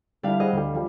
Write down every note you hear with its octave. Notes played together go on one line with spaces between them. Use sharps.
D3 G3 D4 E4 F5
G#4 C5 D#5 F#5
D2 G3
F3 G3